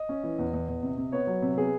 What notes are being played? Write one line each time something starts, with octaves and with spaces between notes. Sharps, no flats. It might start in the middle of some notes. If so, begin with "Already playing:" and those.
Already playing: D#5
C#4
E3
E2
E2
E2
C3
C3
B3 C#5
F#3
C3
B3 G#4